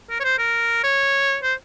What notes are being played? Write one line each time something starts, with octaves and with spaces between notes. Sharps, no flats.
A#4
C#5
C5
A#4
C#5
C5